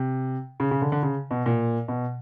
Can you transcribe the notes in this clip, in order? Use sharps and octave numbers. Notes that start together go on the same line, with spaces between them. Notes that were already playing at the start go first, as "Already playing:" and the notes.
Already playing: C3
C#3
C#3
D3
D3
C#3
B2
A#2
B2